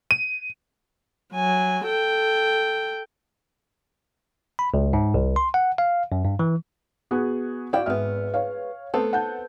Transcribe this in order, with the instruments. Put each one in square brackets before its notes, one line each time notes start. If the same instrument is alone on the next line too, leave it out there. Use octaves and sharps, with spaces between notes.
[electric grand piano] D#7
[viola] F#3 G#5
A4 G5
[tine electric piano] B5
C#2
G#2
C2
C6
F#5
F5
F#2
G2
E3
[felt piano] B3 F#4 G#4
[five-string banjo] E4 G5 [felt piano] F#4 D5 F5
[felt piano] G#1 E5 F6 [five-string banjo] G#3 B3
[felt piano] C#5 F5
[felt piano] A3 [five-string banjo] B3 C4 A4
[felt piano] F#5 A5 G6